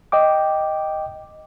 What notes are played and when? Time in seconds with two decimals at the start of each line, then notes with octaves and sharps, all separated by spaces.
0.12 D#5 G5 D6